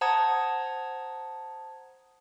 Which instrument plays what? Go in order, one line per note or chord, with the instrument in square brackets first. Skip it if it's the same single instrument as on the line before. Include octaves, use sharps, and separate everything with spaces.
[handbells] C5 F#5 A5 A#5 D#6 G#6